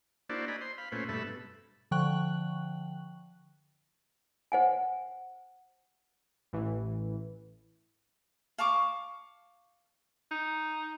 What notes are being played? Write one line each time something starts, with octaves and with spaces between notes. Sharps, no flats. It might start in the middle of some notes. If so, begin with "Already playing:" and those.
A#3 D4 E4 F#4 C5 D5
D5 D#5 G#5 A#5 B5
C5 C6
F5 B5
A#2 A3 C#4 B4 C5
G2 B2 A3 A4 E5 B5
D3 F3 G5 C#6 F#6 F#7
C5 F#5 G#5
A1 E3
F5 A5 C#6 D6
D#4